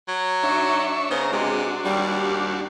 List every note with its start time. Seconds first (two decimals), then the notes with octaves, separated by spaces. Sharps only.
0.08 F#3
0.43 D4 D#4 F#4 C#5 E5 C#6
1.11 C#3 B3 D#4 C5 A#5
1.33 C3 G#3 D4 F#4
1.86 D#2 G3